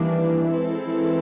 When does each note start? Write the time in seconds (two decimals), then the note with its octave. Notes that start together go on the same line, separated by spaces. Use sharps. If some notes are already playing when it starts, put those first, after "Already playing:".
Already playing: D#3 E3 G3 A#3 D4
0.52 G#3 C4 E4 A4
0.86 E3